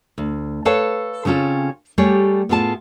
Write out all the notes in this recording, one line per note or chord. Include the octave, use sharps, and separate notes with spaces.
D2
A4 B4 C#5 F5 A5
C#3 C4 C#4 F4 A4
G3 A3 G4 G#4 C#5
A2 B3 F4 G#4 A5